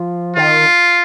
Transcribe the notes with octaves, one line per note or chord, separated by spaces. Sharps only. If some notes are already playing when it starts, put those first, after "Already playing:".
Already playing: F3
D#3 F4